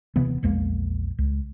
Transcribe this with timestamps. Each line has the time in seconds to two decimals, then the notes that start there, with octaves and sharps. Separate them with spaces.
0.16 D#1 C3 E3 B3
0.43 A#1 E2 G#3 A#3
1.19 C#2